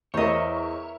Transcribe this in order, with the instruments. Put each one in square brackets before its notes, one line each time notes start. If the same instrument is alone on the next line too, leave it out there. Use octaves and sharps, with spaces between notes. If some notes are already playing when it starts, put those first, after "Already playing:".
[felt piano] E2 [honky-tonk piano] E4 A#4 E5 [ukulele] C5 D#5 [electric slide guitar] C#5